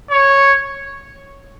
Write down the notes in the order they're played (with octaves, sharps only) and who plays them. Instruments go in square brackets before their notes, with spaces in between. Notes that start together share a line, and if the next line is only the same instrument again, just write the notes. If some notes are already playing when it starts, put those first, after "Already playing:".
[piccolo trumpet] C#5